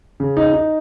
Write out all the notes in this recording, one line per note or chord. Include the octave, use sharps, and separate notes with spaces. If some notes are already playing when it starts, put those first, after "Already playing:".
C#3
D#4
D#4